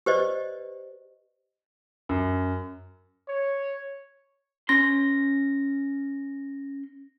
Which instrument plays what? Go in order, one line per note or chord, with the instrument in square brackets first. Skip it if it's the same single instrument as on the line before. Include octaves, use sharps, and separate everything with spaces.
[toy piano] G4 B4 C5 D5 D#5
[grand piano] F#2
[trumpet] C#5
[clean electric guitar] C#4 C6 [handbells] A#6